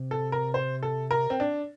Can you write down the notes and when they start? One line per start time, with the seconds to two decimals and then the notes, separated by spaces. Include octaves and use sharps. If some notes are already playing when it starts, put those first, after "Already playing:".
Already playing: C3
0.11 A4
0.32 A#4
0.54 C5
0.83 A4
1.11 A#4
1.30 C4
1.40 D4